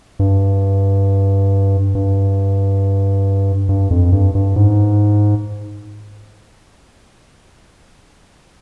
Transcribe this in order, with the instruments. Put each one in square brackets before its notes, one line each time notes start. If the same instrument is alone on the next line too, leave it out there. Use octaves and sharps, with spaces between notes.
[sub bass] G2
G2
G2
F2
G2
G2
G#2